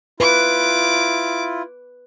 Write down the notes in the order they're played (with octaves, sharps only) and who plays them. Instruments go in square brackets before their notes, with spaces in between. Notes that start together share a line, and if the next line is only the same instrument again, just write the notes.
[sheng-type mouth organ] E4 F4 [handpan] B4 [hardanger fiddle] D6